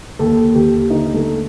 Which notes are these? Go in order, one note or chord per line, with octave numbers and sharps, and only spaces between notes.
D#2 A4
D#2 G4
D3 D#4
A3